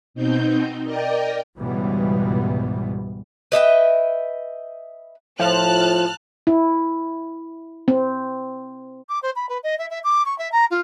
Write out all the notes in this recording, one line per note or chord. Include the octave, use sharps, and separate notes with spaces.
B2 C4 D#4 G6
A#4 D5 D#5 G5
C#2 G#2 B2 E3 G3 B3
B4 D#5 E5 G5
A2 F3 A5 F6 F#6
E4
C4
D6
C5
B5
B4
D#5
E5
E5
D6
C#6
E5
A#5
F4